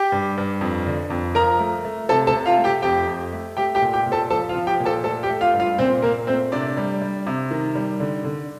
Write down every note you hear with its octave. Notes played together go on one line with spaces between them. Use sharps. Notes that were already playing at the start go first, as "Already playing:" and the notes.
Already playing: G4 G5
G2
G2
F2
D3
F2
F3 A#4 A#5
A3
A3
C3 A4 A5
A4 A5
C3
F4 F5
A3
G4 G5
F2 G4 G5
F2
A3
A3 G4 G5
G4 G5
A#2
G4 G5
A#2
A4 A5
F3 A4 A5
F4 F5
F3
G4 G5
A#2
A4 A5
A3 A4 A5
G4 G5
A3
F4 F5
G2
F4 F5
A#2 C4 C5
A#2 A#3 A#4
A3 C4 C5
C3 D4 D5
G3
G3
C3
D#3
G3
D3
D3